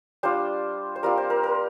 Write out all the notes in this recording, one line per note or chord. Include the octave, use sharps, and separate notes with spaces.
G3 D4 F4 C5
C5
G3 C4 F4 A#4
C5
A#4
A#4